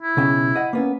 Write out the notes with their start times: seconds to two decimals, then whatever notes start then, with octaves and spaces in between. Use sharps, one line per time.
0.02 E4
0.17 B1 C#3 G5
0.56 D#5 F#5
0.73 A#3 B3 C#4